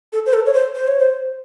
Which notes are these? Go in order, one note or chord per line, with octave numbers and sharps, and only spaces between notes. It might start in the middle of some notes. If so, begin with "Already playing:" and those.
A4
C5
A4
C#5
C5
C5
C#5
C5